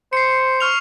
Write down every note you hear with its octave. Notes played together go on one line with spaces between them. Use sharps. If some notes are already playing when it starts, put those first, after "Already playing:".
C5 C7 C#7
C#6 F6 F7